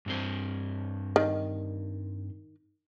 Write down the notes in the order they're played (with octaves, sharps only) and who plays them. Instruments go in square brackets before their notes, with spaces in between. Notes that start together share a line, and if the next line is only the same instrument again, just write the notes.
[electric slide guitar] G2 C4 C5
[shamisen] D#3